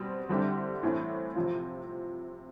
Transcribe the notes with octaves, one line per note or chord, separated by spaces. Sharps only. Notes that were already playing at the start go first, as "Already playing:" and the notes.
Already playing: B2 G3 C4
D3 G3 C4 E4 G4
A2 E3 A3 C4
C3 F3 C4 F4